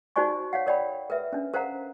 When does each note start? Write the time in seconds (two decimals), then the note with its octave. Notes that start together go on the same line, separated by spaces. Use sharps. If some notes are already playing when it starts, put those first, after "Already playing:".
0.16 D#4 F#4 C5 D5 G#5 C#6
0.53 C#5 F5 F#5
0.66 A#4 C#5 D5 F#5 G5 B5
1.10 A#4 B4 E5
1.33 C#4 D4
1.54 A#4 C5 F5 F#5 A#5